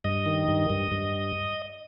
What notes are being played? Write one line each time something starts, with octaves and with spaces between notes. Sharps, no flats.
G2 D#5
D#3
G2
G2
G2